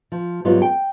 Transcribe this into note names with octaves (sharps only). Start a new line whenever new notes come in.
F3
G#2 F#3 G3 B3 F4
G5